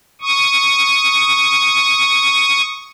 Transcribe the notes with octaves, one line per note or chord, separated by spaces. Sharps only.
C#6 D#6